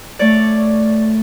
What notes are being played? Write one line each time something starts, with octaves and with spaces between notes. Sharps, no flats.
A3 C#5 D5